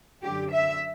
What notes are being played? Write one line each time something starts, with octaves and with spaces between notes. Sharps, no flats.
F#2 D3 G4
E5